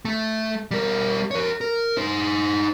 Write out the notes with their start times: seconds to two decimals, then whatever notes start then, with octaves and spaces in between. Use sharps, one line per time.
0.05 A3
0.71 G3 A#4
1.31 A#4 C#5
1.61 A#4
1.97 D#4 C5